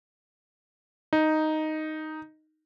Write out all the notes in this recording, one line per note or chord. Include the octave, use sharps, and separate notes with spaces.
D#4